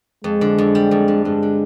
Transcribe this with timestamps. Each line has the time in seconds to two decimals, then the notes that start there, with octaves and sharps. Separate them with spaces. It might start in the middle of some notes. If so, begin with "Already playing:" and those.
0.24 F2 G#3
0.41 D3
0.58 F2
0.75 G3
0.91 F2
1.08 D3
1.25 G2 G#3
1.43 D3